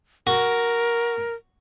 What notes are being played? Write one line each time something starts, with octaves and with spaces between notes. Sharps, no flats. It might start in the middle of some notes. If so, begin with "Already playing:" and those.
F#4 A#4